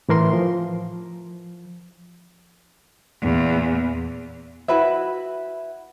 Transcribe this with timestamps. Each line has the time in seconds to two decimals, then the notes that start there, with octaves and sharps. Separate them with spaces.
0.09 A2 E3 A#4 C6
0.33 F3
3.22 E2 A#2
4.68 E4 F#4 B4 E5